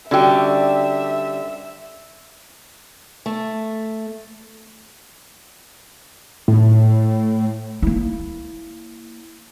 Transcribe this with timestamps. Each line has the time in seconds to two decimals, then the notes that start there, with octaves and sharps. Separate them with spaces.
0.11 D3 G3 C#4 F#4 E5 G5
3.26 A3
6.48 A2
7.82 A#3 E4